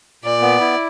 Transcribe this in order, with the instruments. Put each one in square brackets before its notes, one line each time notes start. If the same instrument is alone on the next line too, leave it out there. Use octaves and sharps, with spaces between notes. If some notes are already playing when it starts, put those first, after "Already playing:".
[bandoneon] A#2 [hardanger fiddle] D5
[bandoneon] B3
E4